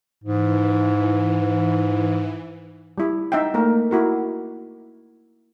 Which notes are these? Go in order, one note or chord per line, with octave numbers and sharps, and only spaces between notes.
G#2 E3
G3 E4
D#4 E5 F#5 G5
A3 A#3 A#4
E4 F#4 A#4